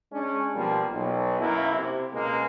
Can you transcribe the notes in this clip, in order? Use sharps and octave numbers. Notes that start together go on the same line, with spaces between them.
G#3 C#4 D4
B2 F3 G3 A#3
B1
B1 F#2 A#3 E4
C3
C#2 B2 G#3 A#3